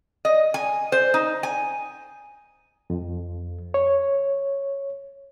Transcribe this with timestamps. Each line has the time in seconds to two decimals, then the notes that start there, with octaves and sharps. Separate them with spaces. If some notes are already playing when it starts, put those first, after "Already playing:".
0.25 D#5
0.54 G#5
0.92 C5
1.14 D#4
1.43 G#5
2.90 F2
3.74 C#5